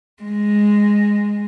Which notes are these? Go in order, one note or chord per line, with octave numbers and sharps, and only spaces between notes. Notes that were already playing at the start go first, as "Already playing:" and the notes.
G#3